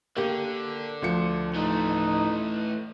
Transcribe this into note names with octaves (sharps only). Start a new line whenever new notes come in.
D3 A#3 G4
D2 F3 C#7
E3 A3 D#4